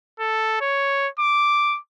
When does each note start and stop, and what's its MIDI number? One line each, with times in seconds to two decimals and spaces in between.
0.19 0.56 69
0.61 1.08 73
1.19 1.78 86